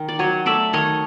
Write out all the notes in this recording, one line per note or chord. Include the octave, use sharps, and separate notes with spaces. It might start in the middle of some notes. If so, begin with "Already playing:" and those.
Already playing: D#3
D5
F#3 C#5 D#5
A3 D5 E5
D#3 C#5 D#5